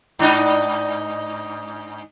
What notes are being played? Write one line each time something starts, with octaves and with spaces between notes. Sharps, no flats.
G#2 D4 D#4